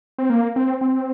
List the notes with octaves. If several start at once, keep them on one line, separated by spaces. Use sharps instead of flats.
C4
A#3
C4
C4